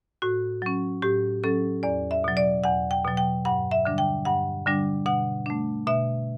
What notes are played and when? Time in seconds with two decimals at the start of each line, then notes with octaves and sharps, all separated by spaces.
0.22 A2 F#4
0.62 F#3 C#4
1.02 A2 G4
1.44 F#3 C#4 A4
1.83 E2 D5
2.11 E5
2.24 B2 F#3
2.37 D5
2.64 E2 F#5
2.91 G5
3.05 B2 F#3
3.17 G5
3.45 G2 F#5
3.71 E5
3.85 D3 G3 D4
3.98 G5
4.25 G2 F#5
4.66 D3 G3 D4
5.06 B2 F#5
5.46 A3 D4
5.87 B2 E5